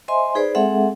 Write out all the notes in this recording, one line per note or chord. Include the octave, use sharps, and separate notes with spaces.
C5 D#5 E5 G#5 C6
D#4 G#4 B4 C5 D5 B5
G#3 C4 G#4 A4 E5 F#5